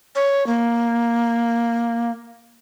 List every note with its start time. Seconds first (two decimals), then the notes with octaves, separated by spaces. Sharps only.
0.15 C#5
0.47 A#3